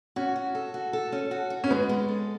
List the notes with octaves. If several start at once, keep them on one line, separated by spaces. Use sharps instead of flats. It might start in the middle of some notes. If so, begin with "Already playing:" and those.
C#4 F#4
F#4
A4
F#4
A4
C#4
F#4
F#4
C#4
G#3 B3
G#3
A4